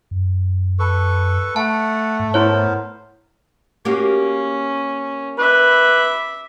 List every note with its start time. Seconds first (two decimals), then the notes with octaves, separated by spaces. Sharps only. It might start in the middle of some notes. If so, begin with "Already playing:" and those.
0.11 F#2
0.79 A4 B4 C#6
1.56 A3 F#5 A5
2.20 G#2
2.34 B3 E4 A#4 C5 C#5
3.85 A#3 C#4 F#4 G4
5.39 B4 E5 D6